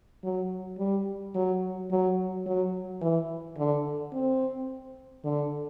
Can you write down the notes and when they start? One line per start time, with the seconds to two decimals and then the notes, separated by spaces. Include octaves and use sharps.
0.24 F#3
0.78 G3
1.35 F#3
1.91 F#3
2.46 F#3
3.01 E3
3.57 D3
4.13 C4
5.24 D3